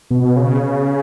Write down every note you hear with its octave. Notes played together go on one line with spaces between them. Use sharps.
B2
C#3